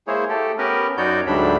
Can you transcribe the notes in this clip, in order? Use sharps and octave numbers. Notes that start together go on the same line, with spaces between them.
G#3 A#3 E4 G#4 C5 C#5
A3 G4 A4
B3 C#4 G4 A#4 B4
F#2 D#4 F#4 C#5 D5 G6
D2 G#2 F#3 G3 D4 B5